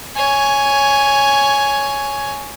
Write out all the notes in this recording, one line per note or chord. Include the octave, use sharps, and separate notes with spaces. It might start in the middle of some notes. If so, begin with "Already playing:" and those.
C#5 G#5